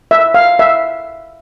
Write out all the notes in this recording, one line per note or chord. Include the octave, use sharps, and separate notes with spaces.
E5
F5
E5